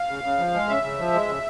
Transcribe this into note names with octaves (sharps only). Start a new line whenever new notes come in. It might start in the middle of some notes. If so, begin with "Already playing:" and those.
Already playing: F5
C#3
C#3
F3
G#3
C#3 E5
C#3
F3
G#3
C#3